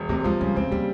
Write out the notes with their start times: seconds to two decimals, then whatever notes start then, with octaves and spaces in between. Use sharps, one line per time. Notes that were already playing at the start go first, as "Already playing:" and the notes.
Already playing: E1
0.09 C3 A3
0.24 F3 G#3
0.40 C#3 G3
0.56 G#3 C4
0.71 G3 A#3